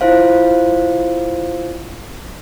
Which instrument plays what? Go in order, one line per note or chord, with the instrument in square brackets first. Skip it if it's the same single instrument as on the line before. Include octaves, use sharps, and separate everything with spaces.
[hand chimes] E4 F4 C5 F5